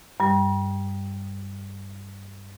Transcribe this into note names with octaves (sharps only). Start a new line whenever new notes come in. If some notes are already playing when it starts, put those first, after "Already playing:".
G2 G3